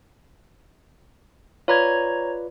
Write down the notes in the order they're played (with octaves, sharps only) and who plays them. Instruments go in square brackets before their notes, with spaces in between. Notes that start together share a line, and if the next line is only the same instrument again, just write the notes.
[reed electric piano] F4 B4 D5 [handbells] C#5 A#5 G#6